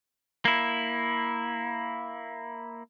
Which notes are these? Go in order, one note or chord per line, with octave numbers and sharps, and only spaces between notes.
A#3 E4